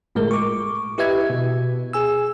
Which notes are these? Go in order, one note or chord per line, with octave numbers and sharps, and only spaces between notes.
G1 A2 G#3 A3 A#4
C#6 D6
E4 G4 B4 D#5 E5 G#6
B2
G#4 G#5 E6